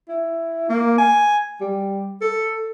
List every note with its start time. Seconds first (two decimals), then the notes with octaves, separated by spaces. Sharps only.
0.09 E4
0.69 A#3
0.98 G#5
1.61 G3
2.21 A4